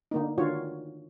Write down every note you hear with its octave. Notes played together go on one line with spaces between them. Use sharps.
D3 A#3 D#4
D3 D#3 F4 F#4 C#5